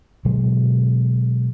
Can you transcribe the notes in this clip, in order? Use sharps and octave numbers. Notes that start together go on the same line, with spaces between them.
B2 D3 F#3 G#3